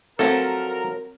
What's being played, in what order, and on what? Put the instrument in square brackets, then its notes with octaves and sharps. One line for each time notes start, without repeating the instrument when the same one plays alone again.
[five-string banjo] F3 F#3 A3 [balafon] C4 [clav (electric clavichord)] A4 [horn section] A#4